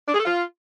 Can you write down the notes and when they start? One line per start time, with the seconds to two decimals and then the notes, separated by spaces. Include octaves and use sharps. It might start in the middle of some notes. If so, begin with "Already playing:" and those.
0.08 D4
0.14 G#4
0.20 A4
0.25 F4